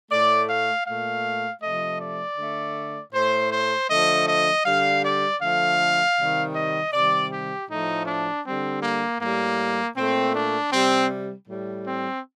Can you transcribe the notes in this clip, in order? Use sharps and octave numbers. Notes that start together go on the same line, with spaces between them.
A2 A3 D5
F5
A#2 A3 F5
C3 F3 A3 D#5
D5
D3 A3
A2 A3 C5
C5
D3 F3 A3 D#5
D#5
D3 G3 F5
D5
D3 F3 A3 F5
C3 D#3 G3
D#5
C3 D#3 G3 D5
G4
A2 F3 A3 D#4
D4
D3 G3 C4
A#3
A2 G3 A#3
A#2 A3 C4
D4
C3 G3 C4
A2 G3
C4